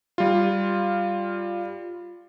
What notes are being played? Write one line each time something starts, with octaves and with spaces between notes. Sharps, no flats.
G3 F4